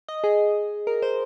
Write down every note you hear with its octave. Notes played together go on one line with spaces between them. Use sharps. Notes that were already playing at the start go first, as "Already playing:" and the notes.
D#5
G#4
A#4
C5